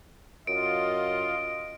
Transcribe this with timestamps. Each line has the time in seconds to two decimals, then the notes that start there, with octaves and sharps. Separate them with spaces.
0.47 F#2 F4 D#5 D7